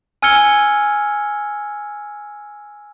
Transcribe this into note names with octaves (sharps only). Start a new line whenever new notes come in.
G#5 E6 F6 G#6 C#7 G7